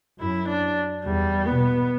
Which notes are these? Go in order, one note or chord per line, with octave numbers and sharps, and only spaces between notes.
F#2 E4
D4
E2 G3
B2 B3